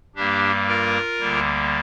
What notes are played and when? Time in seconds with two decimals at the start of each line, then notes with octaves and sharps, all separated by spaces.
0.15 G2 G3 A#3 D4 G4
0.67 F4 A#4
1.19 D2 D3 G3 A#3